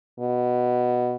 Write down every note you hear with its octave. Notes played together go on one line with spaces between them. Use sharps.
B2